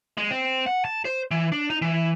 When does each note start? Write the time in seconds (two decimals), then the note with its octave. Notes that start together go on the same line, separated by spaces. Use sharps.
0.17 G#3
0.30 C4
0.66 F#5
0.85 A5
1.05 C5
1.31 E3
1.52 D4
1.70 D#4
1.82 E3